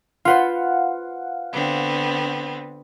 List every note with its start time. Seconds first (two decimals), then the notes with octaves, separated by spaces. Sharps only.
0.25 F4 B4 C5 F5 F#5
1.52 D3 B3 C4